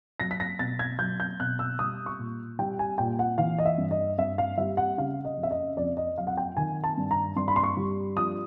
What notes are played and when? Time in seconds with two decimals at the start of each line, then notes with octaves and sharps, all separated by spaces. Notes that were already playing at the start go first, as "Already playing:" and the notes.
0.20 F#3 A#6
0.31 B6
0.40 A#6
0.59 B2 A6
0.79 G#6
0.99 F#3 G6
1.20 G6
1.40 B2 F#6
1.59 E6
1.79 G3 D#6
2.06 C#6
2.19 A#2
2.59 G3 G5
2.79 G#5
2.98 A#2 G5
3.19 F#5
3.38 E3 F5
3.58 D#5
3.65 E5
3.78 G2
3.91 D#5
4.18 G2 E5
4.38 F5
4.58 G3 E5
4.77 F#5
4.98 C#3 F5
5.25 D#5
5.37 F2
5.43 E5
5.51 D#5
5.77 F2 D5
5.97 D#5
6.18 F#3 F5
6.27 F#5
6.37 G5
6.57 D#3 G#5
6.84 A5
6.97 G2
7.11 A#5
7.36 G2 C6
7.48 B5
7.56 C6
7.63 C#6
7.77 G3
8.16 F3 D#6